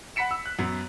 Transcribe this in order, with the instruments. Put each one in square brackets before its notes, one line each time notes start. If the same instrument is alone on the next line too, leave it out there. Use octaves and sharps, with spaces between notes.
[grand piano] F#5 B5 B6 C#7 E7
E6
F#6
F#2 B3